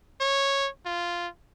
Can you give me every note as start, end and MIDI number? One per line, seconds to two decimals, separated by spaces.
0.21 0.69 73
0.86 1.28 65